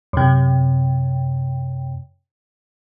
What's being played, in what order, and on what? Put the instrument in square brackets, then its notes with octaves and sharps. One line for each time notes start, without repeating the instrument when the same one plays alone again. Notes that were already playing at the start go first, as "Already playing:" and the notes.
[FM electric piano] F#2 C3